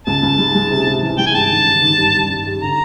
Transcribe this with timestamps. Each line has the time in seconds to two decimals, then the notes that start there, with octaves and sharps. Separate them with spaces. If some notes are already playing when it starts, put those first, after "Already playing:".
0.07 C#2 A5
0.23 C#2
0.38 G#3
0.55 G#3
0.71 C3
0.86 C3
1.02 E3
1.18 G#3 G5
1.26 G#5
1.35 G2 A5
1.50 D#3
1.66 D#3
1.82 D#3
1.98 G2
2.15 G2
2.30 G2
2.46 G3
2.62 D3 A#5